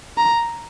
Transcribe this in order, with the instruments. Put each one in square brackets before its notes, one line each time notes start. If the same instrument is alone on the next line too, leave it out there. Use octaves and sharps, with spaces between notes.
[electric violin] A#5